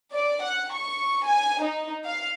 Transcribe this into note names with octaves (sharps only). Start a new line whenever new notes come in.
D5
F#5
C#6
G#5
D#4
F5